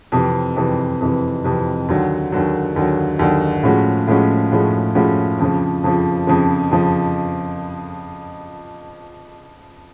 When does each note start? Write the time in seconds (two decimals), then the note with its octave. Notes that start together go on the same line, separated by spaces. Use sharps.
0.12 F2 C3 E3
0.57 F2 C3 E3
1.00 F2 C3 E3
1.44 F2 C3 E3
1.88 D#2 D3 F#3
2.32 D#2 D3 F#3
2.76 D#2 D3 F#3
3.19 D#2 D3 F#3
3.63 A2 F3 G#3 C#4 F#4
4.07 A2 F3 G#3 C#4 F#4
4.52 A2 F3 G#3 C#4 F#4
4.95 A2 F3 G#3 C#4 F#4
5.39 F2 C#3 F3
5.84 F2 C#3 F3
6.27 F2 C#3 F3
6.71 F2 C#3 F3